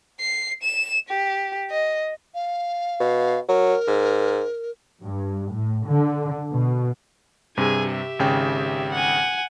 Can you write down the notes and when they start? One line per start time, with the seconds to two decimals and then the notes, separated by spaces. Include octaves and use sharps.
0.20 C7
0.63 E7
1.09 G4
1.71 D#5
2.34 F5
3.00 B2
3.48 F#3 A#4
3.87 G#2
5.02 G2
5.52 A2
5.86 D3
6.51 B2
7.57 G2 C3 G#4 G#5
7.89 G4 E5
8.19 G#1 C#3 G5
8.92 F#5 G#5